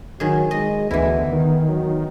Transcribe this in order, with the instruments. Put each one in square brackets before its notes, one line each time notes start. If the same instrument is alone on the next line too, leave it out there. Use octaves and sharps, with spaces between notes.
[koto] D#3 G#4 [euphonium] F#3
[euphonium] G#3 [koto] D#5
[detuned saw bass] D2 [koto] E3 E4 [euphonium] B3
[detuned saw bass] D#3
[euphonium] F#3